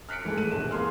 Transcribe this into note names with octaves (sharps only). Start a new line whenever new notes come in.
F6 F#6 B6 C#7 D7
G#2 E3 G#3 A3
G#3 F#6 D#7
D#1 E7
E3 A#3 G#4 C6 F6